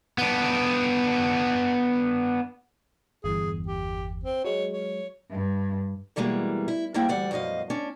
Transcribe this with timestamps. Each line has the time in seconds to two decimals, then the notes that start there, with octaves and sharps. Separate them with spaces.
0.18 B3 D4
3.24 G1 E2 G#4
3.66 G4
4.24 C4
4.45 F#3 G#3 C#5
4.73 C#5
5.31 G2
6.16 B2 E3 G3 G#3 A#3
6.68 E4
6.94 G#2 G3 A#3 E4 E5 G5
7.08 D2 E3 G3 D5 F#5
7.31 F#2 B2 F3 D#5 F5
7.70 C#4 D4